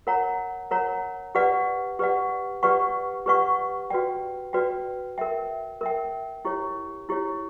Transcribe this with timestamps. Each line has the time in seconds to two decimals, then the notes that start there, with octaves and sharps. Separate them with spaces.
0.07 A#4 C#5 F#5 A#5
0.71 A#4 C#5 F#5 A#5
1.35 G4 B4 D5 F#5
1.99 G4 B4 D5 F#5
2.63 G4 B4 D5 F#5 C#6
3.26 G4 B4 D5 F#5 C#6
3.90 F#4 B4 D5 G5
4.53 F#4 B4 D5 G5
5.18 A#4 E5 G5
5.81 A#4 E5 G5
6.45 E4 G4 C#5
7.09 E4 G4 C#5